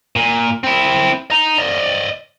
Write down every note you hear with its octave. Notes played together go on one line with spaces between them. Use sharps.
A#2
C4 E4
D#5 A#5
D5 D#5